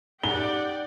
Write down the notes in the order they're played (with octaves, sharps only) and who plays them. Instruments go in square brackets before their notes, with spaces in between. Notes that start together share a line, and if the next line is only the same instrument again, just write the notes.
[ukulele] D#4 [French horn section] G4 [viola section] D5 F#5 G5 [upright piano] G7